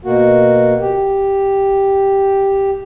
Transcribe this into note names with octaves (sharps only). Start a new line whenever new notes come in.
B2 A#3 F#4
G4